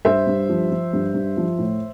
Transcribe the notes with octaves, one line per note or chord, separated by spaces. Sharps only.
G2 C5 E5
G2
F3
F3
G2
G2
F3
A2